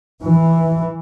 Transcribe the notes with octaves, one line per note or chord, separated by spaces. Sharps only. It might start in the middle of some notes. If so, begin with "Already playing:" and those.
E3